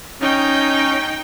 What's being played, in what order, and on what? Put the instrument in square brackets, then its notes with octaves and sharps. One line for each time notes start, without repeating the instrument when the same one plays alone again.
[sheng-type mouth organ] C#4 [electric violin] D#4 G5